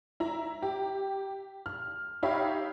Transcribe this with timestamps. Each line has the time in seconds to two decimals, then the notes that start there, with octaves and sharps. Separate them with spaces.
0.20 E4 A#5
0.62 G4
1.66 F6
2.23 D#4 G4 C#5 E5 F5 B5